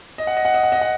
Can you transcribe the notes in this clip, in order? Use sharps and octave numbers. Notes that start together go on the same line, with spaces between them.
D#5
F#5
D#5
F#5
D#5
F#5
D#5
F#5